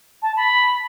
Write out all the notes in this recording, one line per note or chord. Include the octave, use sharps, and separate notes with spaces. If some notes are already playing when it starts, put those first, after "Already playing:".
A5
B5